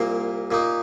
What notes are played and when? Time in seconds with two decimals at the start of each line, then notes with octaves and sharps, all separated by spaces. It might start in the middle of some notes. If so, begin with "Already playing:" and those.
Already playing: C2 A#2 A#3 C6
0.51 A#2 A#3 D#4